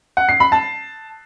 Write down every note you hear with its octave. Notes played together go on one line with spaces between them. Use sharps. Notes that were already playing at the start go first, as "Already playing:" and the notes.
F#5
C7
B5
A5